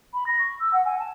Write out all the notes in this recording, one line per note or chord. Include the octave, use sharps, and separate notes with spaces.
B5
A#6
C#6
E6
F#5
G#5
A5